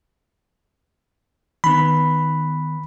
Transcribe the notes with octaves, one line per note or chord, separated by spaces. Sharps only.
D#3 B3 B5